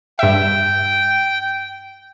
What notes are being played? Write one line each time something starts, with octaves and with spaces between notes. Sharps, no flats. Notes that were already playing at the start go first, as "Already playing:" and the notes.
G2 E5 G5